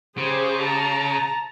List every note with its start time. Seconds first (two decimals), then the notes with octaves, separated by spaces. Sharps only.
0.18 C#3 G4 G#4 C5
0.62 A5 A#5